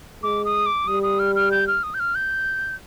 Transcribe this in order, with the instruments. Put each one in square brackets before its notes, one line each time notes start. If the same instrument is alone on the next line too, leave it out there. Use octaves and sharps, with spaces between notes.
[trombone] G#3 [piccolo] D6
[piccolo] D#6
D6
[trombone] G3 [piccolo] D#6
[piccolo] D#6
F6
F6
G6
F6
D#6
G6
F6
G6